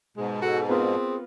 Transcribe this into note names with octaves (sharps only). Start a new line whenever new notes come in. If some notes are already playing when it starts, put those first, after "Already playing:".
G#2 B2 G#3
F#4 A4
B3 C4 F4 G#4 A#4